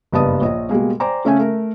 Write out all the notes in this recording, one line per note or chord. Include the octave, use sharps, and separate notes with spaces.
F#1 G2 B3 D#5 A5 D#6
A#1 C#5 D#5
B2 G3 G#3 A#3
C5 D5 G5 G#5 A#5 D6
C#3 A3 C#4 E5 F5 G#5
A3 A#4